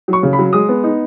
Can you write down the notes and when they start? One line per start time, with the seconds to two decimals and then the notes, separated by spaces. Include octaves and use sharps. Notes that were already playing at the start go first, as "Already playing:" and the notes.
0.08 F#3
0.13 C#6
0.23 C#3
0.33 B5
0.39 F#3
0.53 G#3 D#6
0.69 B3
0.84 D#4